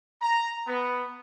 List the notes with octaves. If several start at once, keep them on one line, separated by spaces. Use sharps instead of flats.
A#5
B3